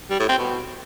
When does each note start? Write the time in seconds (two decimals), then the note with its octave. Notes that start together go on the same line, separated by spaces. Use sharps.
0.10 G3
0.20 A2
0.29 C4
0.38 B2